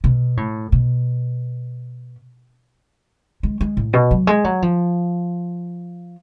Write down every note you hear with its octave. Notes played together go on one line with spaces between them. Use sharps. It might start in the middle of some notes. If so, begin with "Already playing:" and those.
B2
A2
B2
G#3
G#3
A2
B2
F#3
G#3
F#3
F3